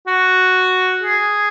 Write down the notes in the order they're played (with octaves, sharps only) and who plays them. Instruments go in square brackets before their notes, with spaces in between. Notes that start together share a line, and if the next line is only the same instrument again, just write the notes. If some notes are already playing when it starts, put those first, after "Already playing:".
[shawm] F#4
G#4